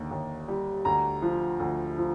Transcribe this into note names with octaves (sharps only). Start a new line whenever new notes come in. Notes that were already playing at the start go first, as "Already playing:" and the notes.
Already playing: D#2 D3
D#2
G3
D2 A#5
F3
D2
F3